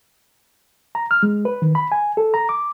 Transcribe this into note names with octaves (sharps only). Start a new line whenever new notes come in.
A#5
F6
G#3
B4
D#3
B5
G#5
A4
A#5
D6